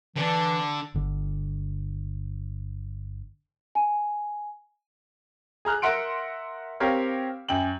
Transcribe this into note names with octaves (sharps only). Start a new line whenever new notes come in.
D3 E3 D4
G1 D3
G#5
G#4 A#5 F6 F#6
A#4 E5 F#5 C6 D7
C4 G4 A#4 C#5 F5
F#2 G5 F#7